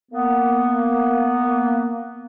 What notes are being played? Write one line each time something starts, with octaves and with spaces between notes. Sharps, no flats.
A#3 B3